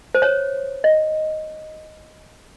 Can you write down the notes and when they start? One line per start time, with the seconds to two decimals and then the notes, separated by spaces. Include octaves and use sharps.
0.15 C5
0.22 C#5
0.84 D#5